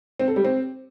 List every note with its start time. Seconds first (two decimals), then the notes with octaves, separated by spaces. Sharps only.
0.19 C4
0.28 A4
0.36 G3
0.44 C4